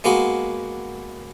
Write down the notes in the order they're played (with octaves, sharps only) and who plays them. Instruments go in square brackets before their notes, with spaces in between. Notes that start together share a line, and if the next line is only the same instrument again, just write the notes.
[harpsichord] G#3 A#3 B3 F#4